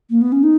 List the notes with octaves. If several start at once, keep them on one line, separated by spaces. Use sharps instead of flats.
A#3
B3
C#4
D#4